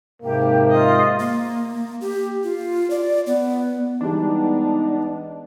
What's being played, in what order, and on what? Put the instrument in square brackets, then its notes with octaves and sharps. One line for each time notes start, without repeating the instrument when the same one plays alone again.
[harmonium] G#2 C3 [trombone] A#3 [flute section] G4
[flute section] F4 [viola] D#5
[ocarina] A#3
G4
F4
D5
B3
[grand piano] E3 G3 G#3 [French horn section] B3 D#4 [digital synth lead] D4